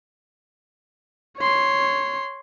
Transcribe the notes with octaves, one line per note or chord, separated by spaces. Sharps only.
C#5 C6